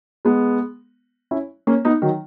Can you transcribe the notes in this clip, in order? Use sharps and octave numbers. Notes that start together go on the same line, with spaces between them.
G#3 B3
C#4 E4
A#3 C#4
B3 D#4
D#3 F#3